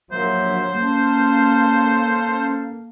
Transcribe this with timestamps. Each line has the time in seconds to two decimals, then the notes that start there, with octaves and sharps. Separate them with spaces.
0.12 A#1 F#3 A#3 C5 E5
0.79 A#3 C#4 A4 F5